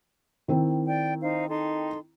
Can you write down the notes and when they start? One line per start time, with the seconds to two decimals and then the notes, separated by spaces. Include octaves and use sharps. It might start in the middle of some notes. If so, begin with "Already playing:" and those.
0.48 D#3 C4 E4
0.88 D5 G5
1.21 D#4 C5 F5
1.49 D#4 A4 C6